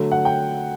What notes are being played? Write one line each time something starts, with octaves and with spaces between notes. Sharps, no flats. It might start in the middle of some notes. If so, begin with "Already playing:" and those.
Already playing: D3 F#3 A3
F#5
G5